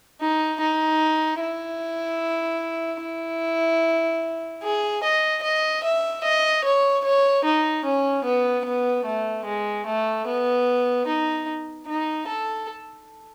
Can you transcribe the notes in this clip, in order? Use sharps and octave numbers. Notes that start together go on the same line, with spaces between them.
D#4
D#4
E4
E4
G#4
D#5
D#5
E5
D#5
C#5
C#5
D#4
C#4
B3
B3
A3
G#3
A3
B3
D#4
D#4
A4